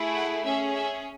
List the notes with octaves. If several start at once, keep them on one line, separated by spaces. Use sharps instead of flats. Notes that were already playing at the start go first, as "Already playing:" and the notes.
Already playing: A3 E4 G#4
F#5
C#4 G#4 E5
E5